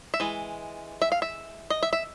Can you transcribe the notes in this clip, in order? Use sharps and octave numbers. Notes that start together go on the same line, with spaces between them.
E5
E3 G#3
E5
F5
E5
D#5
E5
E5